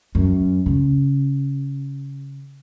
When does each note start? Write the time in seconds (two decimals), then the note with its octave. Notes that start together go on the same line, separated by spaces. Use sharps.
0.15 F#2
0.66 C#3